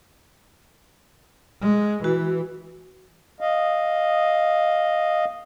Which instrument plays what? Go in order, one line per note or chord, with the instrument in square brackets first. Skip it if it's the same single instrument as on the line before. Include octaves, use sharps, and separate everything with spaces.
[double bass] G#3
[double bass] E3 [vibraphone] F#4
[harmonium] D#5 F5